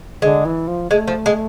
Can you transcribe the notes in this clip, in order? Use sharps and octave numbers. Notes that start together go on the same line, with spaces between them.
D3 G#3
E3
F3
G#3 A3
F3
G#3